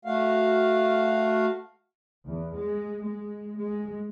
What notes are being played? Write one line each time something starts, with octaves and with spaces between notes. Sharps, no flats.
A3 F#4 F5
E2
G#3
G#3
G#3